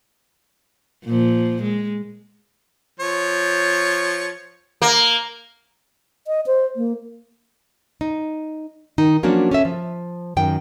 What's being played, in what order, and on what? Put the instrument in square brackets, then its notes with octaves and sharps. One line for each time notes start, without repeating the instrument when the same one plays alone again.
[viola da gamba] A#2 F3
G#3
[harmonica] F3 C#5
[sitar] A#3
[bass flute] D#5
C5
A#3
[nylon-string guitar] D#4
D#3 D#4
F3 F#3 A#3 C#4 D4 F#4
C#4 A4 E5
F3
F#2 D#3 G5